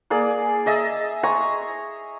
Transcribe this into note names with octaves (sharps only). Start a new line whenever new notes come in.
A#3 G#4 D5
G#4 D#5 E5 A5
G#5 A#5 C6 C#6